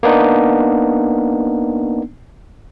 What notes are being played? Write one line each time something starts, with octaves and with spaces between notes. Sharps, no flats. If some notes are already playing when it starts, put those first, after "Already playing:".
A#3 B3 D4 D#4